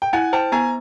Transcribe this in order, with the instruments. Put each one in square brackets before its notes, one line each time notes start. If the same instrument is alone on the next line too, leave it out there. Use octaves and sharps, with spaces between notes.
[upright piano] G5
[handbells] E4 [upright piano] F#5 G#5
[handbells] C5 [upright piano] G5 A5
[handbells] B3 [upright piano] G#5 A#5